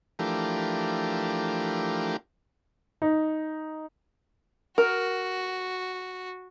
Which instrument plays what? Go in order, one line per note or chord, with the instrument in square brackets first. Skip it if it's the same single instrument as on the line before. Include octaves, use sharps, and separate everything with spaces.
[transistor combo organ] E3 F3 A3 D4 G4 A#4
[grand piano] D#4
[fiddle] F#4 [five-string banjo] A#4